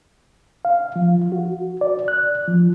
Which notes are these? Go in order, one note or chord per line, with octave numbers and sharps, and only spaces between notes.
F5
F3
F#4
D5
F#6
F3